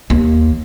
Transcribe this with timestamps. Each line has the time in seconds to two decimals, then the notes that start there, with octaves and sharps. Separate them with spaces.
0.10 D#2